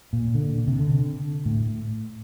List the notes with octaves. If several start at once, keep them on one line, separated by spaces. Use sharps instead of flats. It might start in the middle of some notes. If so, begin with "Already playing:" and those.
A#2
D3
C3
D3
A2